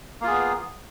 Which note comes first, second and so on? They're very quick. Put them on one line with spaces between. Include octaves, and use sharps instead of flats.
A#3 F4 G#4 B3